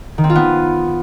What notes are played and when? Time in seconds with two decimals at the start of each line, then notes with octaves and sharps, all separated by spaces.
0.18 D#3
0.24 C4
0.30 F4
0.35 B3